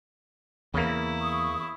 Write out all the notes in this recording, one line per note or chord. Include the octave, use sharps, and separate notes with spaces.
E2 C#3 A#3 E4
C#6 D#6